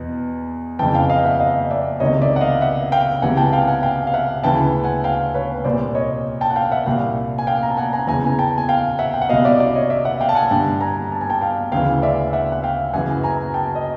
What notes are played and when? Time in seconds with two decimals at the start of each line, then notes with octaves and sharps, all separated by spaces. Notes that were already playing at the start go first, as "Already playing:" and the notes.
Already playing: E2 B2
0.79 F2 C#3 E3 G5 A5
0.94 F5 G5
1.09 D#5 F5
1.25 E5 F#5
1.40 D#5 F5
1.70 D5 E5
2.00 C#2 C3 D#3 C#5 D#5
2.22 D5 E5
2.36 F#5
2.41 D#5 F5
2.61 E5 F#5
2.92 F5 G5
3.22 C#2 C3 E3 F#5 G#5
3.37 G5 A5
3.53 F5 G5
3.67 F#5 G#5
3.83 F5 G5
4.07 F5
4.14 E5 F#5
4.44 D2 C#3 E3 G5 A5
4.84 F#5 G#5
5.04 F5 G5
5.35 B4 C#5
5.65 C2 A#2 C5 D5
5.95 C#5 D#5
6.41 G5 A5
6.50 F#5
6.56 F5 G5
6.72 E5 F#5
6.86 C2 A#2 F5 G5
7.38 G#5
7.47 F5 G5
7.63 A#5
7.70 A5
7.77 F#5 G#5
7.93 G#5 A#5
8.07 E2 C#3 E3 G#5 A#5
8.27 G#5
8.39 G5 A5
8.58 G#5
8.69 F5 G5
8.99 E5 F#5
9.14 G5
9.22 F#5
9.29 C2 B2 D#5 F5
9.45 D5 E5
9.59 D5 E5
9.75 C#5 D#5
9.90 D5 E5
10.05 E5 F#5
10.21 F5 G5
10.29 A5
10.35 F#5 G#5
10.51 G2 D3 G5 A5
10.81 G#5 A#5
11.12 A5
11.21 G#5
11.30 G5 A5
11.41 F5 G5
11.72 D2 C#3 E3 F5 G5
12.02 D5 E5
12.33 E5 F#5
12.52 F#5
12.63 F5 G5
12.93 F#2 C#3 E3 F#5 G#5
13.23 G#5 A#5
13.54 G5 A5
13.75 D#5